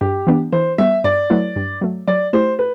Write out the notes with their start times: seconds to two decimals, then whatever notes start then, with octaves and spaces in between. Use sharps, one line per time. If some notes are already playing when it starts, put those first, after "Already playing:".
0.01 G2 G4
0.27 E3 B3 D4
0.52 E3 C5
0.78 G3 B3 E5
1.04 G2 D5
1.30 F#3 A3 E4 B4
1.56 G2
1.81 F#3 A3
2.07 F#3 D5
2.33 A3 E4 G4 C5
2.59 B4